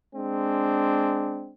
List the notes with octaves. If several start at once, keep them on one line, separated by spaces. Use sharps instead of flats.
G#3 C4 D4